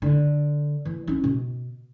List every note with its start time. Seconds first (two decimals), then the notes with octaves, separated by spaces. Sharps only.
0.02 D3
0.85 E3
1.08 C#4 D#4
1.24 B2